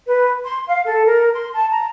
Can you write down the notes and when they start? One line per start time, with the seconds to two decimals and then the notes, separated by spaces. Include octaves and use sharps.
0.06 B4
0.44 C6
0.67 F5
0.85 A4
1.05 A#4
1.34 C6
1.55 A5
1.70 A#5